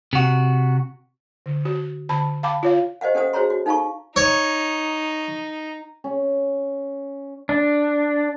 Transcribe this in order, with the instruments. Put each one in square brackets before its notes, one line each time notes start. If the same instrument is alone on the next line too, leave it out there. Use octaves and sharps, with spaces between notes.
[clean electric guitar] C3 F#4
[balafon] D3
F#4
D3 A5 B5
F5 G5 A5 B5 D6
F4 C#5 F5
[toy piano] G4 C5 D#5 F5 F#5
C#4 G4 A4 C5 F#5 D#6
F#4 G#4 C5 C#5 A#5 C6
F#4
D#4 A4 F5 A5 A#5 C#6
[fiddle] D#4 [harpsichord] C#5
[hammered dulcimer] C#4
[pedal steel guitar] D4